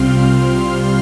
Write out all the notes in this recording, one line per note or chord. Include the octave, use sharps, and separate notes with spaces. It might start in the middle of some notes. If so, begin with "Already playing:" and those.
Already playing: C2 C3 G3 C4 F4 C6 F6